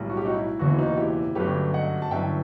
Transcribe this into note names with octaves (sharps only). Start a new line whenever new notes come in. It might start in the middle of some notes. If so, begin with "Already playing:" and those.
Already playing: B1 A2 G3
F#4
G4
D#4 F#4
E4
F#1 E2 B2 F#4
E4
D#4 F#4
E4 G4
G1 F#2 F#3 A3 G4 B4
D#5 F#5
A5
G1 F#2 E3 E5 G5